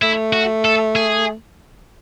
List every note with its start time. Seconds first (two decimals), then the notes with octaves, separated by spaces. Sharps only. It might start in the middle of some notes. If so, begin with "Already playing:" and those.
0.02 A3 E4
0.33 F#4
0.65 A4
0.96 G#4